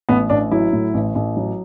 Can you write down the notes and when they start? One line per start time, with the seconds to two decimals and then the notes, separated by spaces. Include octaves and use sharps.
0.09 A1 B3
0.30 A1 D4
0.51 F#3 E4
0.73 A2
0.94 A1
1.15 A1
1.37 F#3